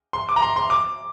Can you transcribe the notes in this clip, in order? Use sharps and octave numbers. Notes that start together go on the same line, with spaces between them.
C6
D6
A#5
C6
C6
D6